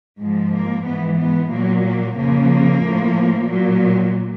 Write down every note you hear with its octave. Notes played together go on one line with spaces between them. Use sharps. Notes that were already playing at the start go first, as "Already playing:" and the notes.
G#2 F3 G#3
A#3
G#2 E3 B3
B3
A#2 F#3 A#3
A#3
F2 C#3 F3 A#3
A2 F3
A#2 F#3